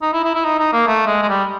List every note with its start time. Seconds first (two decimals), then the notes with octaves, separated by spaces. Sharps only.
0.03 D#4
0.13 E4
0.24 E4
0.35 E4
0.45 D#4
0.59 D#4
0.73 A#3
0.87 A3
1.07 G#3
1.23 G#3
1.29 G3